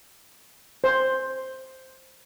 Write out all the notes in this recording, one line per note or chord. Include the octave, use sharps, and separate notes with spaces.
C5